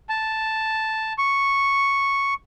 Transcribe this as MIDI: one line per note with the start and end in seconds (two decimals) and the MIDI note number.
0.09 1.13 81
1.18 2.34 85